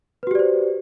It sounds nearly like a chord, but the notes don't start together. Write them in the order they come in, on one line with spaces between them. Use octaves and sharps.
B4 F#4 G4 D5 C5